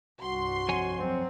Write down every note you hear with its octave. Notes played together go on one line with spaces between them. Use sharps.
C2 G2 F#4 C6
F2 C#5 G#5
F#3 C4